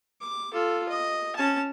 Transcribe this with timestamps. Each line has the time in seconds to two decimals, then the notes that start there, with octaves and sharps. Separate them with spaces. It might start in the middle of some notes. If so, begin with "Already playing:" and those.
0.21 D6
0.53 F4 A4
0.89 D#5
1.36 C#4 A5